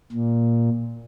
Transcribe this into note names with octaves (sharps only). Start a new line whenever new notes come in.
A#2